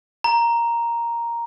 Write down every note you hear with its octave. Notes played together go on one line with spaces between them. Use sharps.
A#5